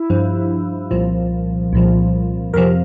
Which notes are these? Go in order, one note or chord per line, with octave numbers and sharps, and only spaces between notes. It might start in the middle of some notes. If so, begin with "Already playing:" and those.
Already playing: E4
G2 F3
C2 A#2 F3
C2 A#2 F3
F2 C3 F3 A#4